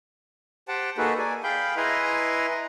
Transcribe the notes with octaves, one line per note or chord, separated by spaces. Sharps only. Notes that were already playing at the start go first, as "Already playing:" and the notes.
G4 C5 F#5 G5 A5
A#3 D#4 F#4 G#4 A4 B4
D5 G#5
G#4 F5 G5 B5 G6
E4 B4 D#5 G#5 A#5 C6